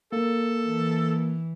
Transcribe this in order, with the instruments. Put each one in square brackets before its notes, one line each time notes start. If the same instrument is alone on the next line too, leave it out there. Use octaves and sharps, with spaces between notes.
[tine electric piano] A#3 [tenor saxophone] A4
[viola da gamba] E3